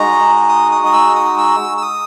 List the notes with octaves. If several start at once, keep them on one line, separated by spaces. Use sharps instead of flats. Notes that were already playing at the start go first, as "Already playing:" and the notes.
Already playing: G#3 D#4 F#4 A#5
D#6
D#6
D#6
E6
D#6
E6
E6
D#6